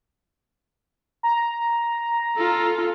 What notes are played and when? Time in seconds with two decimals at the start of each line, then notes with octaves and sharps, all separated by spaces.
1.23 A#5
2.37 F4 A4